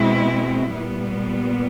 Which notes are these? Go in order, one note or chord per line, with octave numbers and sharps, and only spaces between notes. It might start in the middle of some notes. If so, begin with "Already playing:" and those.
Already playing: B2 G#3 C4 E4
A#2 G3 B3